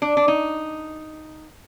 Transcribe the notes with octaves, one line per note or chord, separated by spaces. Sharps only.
D4
D4
D#4